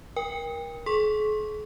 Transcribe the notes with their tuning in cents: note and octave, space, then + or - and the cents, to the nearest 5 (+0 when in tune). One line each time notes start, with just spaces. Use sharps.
A#4 +25 G5 +30
G#4 +45 C6 +40